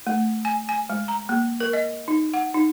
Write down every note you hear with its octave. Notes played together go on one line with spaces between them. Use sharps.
A3
G#5
G#5
G#3
A#5
A#3
A#4
D#5
D#4
F#5
D#4